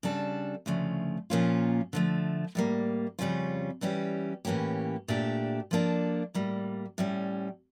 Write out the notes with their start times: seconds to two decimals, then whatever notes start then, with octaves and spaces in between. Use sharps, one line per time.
0.03 C#3 G3 D4 A4
0.66 D2 C#3 F3 A3
1.30 A#2 F3 A#3 C#4 F4
1.93 D3 F3 A3
2.55 A2 G3 A#3
3.19 F2 C#3 G3 C#4 F4
3.81 E3 G3 C#4 G4
4.45 A2 E3 A#3 C#4 G4
5.08 A#2 A3 D4 G4
5.71 F3 A#3 D4 A4
6.34 A2 G3 A#3
6.98 A2 G3 C#4